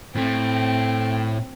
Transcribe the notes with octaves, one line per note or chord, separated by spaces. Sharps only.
A2 A3 C4